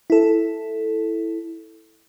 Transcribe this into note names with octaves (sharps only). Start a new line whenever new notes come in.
E4 A4